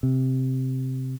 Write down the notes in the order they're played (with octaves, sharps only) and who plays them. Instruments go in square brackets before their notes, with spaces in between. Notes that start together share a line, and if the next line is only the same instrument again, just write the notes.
[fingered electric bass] C3